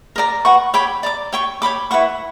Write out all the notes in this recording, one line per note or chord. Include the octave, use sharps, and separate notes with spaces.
A#4 D5 A#5
B4 F#5 C#6
C#5 G5 B5 D6
D5 A#5 D6
C#5 G5 C#6
C#5 G5 B5 D6
E4 B4 F#5 C#6